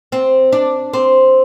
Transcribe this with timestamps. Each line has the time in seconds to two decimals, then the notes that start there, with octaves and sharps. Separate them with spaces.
0.12 C4
0.53 D4
0.93 C4